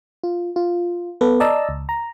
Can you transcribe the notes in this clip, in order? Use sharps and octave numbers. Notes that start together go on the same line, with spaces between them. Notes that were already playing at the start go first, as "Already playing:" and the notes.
F4
F4
B3 A4 B4
D5 D#5 A5 A#5 E6
C#2
A#5